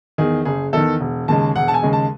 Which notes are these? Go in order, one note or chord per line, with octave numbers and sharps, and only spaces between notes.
E2 D#3 G#4
F#1 G#4
E2 D#3 A4
E1
D#2 C#3 G#3 A5
E1 F#5
A5
G#5
D#2 C#3 G#3
A5